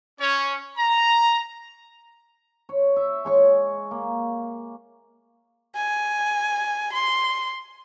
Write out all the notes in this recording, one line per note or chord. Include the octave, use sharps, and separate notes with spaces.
C#4 C#5
A#5
C#5
E5
G#3 C#5 C#6
A#3
G#5
C6